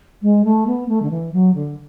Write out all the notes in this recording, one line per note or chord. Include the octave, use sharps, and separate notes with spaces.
G#3
A3
B3
A3
D3
E3
F#3
D3